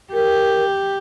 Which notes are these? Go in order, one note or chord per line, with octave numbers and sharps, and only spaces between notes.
G4 A#4